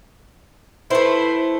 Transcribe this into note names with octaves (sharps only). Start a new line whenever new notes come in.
A3 E4 B4 C5